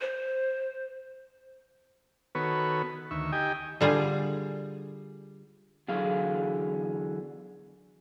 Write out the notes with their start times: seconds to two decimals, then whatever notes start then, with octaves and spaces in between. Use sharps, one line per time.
0.01 C5
2.35 D#3 B3 F#4 A4 B4 C#5
3.11 D2 D#3 E5 C#6
3.32 D#4 G4 D#5 G5 G#5
3.81 D3 G3 F4 G#4
5.88 E2 D3 F#3 G#4 F5